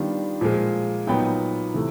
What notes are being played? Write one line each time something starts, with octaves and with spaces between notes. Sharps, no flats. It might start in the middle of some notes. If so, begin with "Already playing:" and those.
Already playing: D#3 G3 B3 D4 F4
A#2 F3 G#3
A#2 F#3 B3 D#4 G5
C3 E3 A3